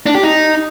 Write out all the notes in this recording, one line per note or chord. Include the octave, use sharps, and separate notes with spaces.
D4
G4
D#4